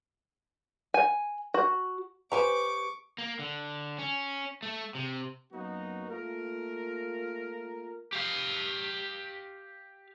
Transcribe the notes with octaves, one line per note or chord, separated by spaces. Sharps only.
G#5
F#4
G4 B4 C5 G#5 A#5 C#6 D6
A#3
D3
C#4
A3
C3
F#2 F#3 A#3 B3 D#4 F#4
A3 A#3 F4 A#4
G4 F5